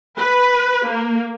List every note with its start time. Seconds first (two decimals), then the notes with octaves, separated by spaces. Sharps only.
0.19 B4
0.88 A#3